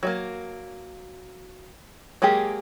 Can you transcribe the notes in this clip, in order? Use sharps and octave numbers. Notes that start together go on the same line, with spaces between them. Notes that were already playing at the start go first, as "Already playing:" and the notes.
F#3 A3 A#3
F#3 G#3 A#3 G4 G#4